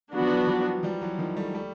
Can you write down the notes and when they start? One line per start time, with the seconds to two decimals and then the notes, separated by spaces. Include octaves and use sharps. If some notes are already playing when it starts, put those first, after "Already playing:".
0.13 F#3 B3 D4 F#4
0.20 F3
0.27 E3 F#3
0.47 F3 G3
0.83 F3 G3
1.01 E3 F#3
1.19 D#3 F3
1.37 G3 A3
1.54 G3 A3